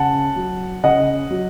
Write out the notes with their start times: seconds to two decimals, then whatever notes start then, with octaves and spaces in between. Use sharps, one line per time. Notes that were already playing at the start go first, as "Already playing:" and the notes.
Already playing: C#3 F#5 A5
0.36 F#3
0.83 C#3 D#5 F#5
1.31 F#3